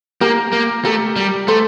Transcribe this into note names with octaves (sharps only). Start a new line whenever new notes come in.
A#3 G4 A#4
A#3
A3 G4 A#4
G3
A3 A4 C5